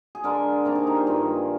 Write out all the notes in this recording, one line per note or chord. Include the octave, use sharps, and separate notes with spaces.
G#4
D3 G#3 D4 A#4
C3 D#3 A#3 D4 A#4
D#4
D#4
F4
G2 D#3 G#3 C4